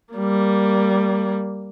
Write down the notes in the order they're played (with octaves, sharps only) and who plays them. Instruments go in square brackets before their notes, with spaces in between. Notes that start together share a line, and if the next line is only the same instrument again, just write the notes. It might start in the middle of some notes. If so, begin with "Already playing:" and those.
[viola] G3 A#3